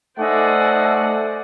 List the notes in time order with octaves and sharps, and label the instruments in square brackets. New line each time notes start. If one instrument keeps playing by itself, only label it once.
[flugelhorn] A3 [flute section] D#4 G#5 E6 [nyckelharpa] C5 D5 [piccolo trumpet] F#5